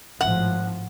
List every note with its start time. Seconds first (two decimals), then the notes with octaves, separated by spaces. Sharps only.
0.21 G#1 A2 F3 F#5